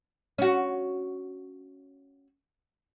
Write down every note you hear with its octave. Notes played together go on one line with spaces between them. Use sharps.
C#4 F#4